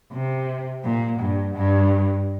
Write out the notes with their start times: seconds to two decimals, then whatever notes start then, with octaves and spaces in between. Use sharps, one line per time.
0.13 C3
0.84 A#2
1.20 G2
1.55 G2